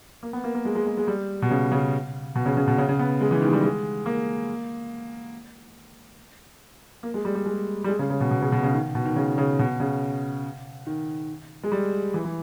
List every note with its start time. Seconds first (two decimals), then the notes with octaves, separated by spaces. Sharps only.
0.23 A#3
0.33 B3
0.44 A#3
0.55 A#3
0.65 G#3
0.75 G#3
0.87 G#3
0.97 G#3
1.07 G3
1.42 B2
1.50 C#3
1.72 C#3
2.35 B2
2.46 C#3
2.57 C#3
2.68 B2
2.78 C#3
2.88 C#3
2.99 B3
3.21 G#3
3.31 E3
3.42 D#3
3.48 G#3
3.53 G3
3.63 G#3
4.06 A#3
7.03 A#3
7.14 G#3
7.25 G3
7.35 G3
7.46 G#3
7.84 G3
7.89 G#3
7.99 C#3
8.10 C#3
8.20 B2
8.31 B2
8.42 C#3
8.52 B2
8.63 C#3
8.74 D#3
8.95 B2
9.05 D#3
9.16 C#3
9.38 C#3
9.59 B2
9.80 C#3
10.87 D#3
11.64 G#3
11.72 G3
12.14 E3
12.24 E3